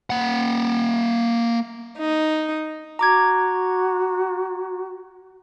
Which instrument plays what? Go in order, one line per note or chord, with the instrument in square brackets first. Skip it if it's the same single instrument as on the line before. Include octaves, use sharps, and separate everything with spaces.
[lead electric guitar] A#3 F#5
[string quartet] D#4
[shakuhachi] F#4 [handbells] A#5 D6 G#6